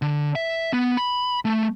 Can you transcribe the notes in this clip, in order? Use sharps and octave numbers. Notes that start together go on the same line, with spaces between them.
D3
E5
B3
B5
A3